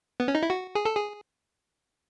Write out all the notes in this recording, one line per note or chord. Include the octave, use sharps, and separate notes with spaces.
B3
C#4
D#4
E4
F#4
G#4
A4
G#4